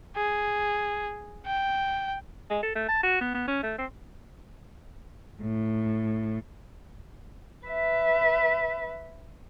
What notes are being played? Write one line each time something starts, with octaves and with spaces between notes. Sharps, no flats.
G#4
G5
G#3
A4
A3
A5
F#4
B3
B3
C#4
A3
C4
A2
B4 E5